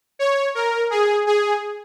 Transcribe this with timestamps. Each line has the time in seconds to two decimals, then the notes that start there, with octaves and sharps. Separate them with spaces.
0.19 C#5
0.55 A#4
0.90 G#4
1.27 G#4